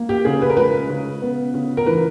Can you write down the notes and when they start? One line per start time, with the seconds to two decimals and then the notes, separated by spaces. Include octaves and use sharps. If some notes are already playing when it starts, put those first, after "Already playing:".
Already playing: A#3
0.09 G4
0.25 C#3 G#4
0.42 B4
0.50 A#4
0.57 G#3 B4
0.89 C#3
1.22 B3
1.54 C#3
1.77 A#4
1.86 E3 B4